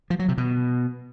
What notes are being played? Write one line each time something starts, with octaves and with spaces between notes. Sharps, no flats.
F3
F#3
C3
B2